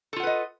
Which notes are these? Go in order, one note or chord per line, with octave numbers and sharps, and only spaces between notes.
F4 A4 B4 D#5 F#5